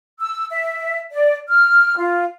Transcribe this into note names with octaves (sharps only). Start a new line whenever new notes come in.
E6
E5
D5
F6
F4